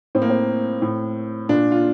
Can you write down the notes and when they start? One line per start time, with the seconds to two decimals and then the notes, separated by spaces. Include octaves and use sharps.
0.15 A2 C4
0.22 A#3
0.29 C4
0.82 A2
1.49 A#2 D4
1.71 F4